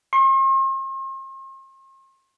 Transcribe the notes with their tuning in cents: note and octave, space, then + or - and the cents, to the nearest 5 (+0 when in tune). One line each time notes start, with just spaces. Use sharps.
C6 +45